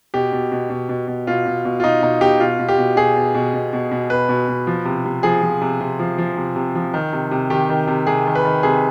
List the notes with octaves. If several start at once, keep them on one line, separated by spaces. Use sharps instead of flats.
B2 G4
B2
B2
B2
B2
B2
B2 F4
B2
B2
F4
B2 D#4
B2 D#4
B2 G4
B2 F4
B2
G4
B2
B2 G#4
B2
B2
B2
B2
B2
B2 B4
B2
B2
F3
C3
C3
F3 G#4
F3
C3
C3
F3
F3
C3
C3
F3
D#3
C3
C3
D#3 G4
D#3
C3
C3 G#4
D#3
B4
D#3
C3 G#4